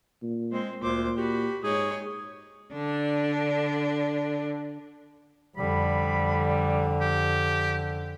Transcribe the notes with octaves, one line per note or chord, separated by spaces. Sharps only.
A#2
G#3 C4 C5
D2 A#2 C5 D6
F#4 G4 B5
G#2 D#4 G#4 C#5
D3 D4
F2 D3 G3 B5
G4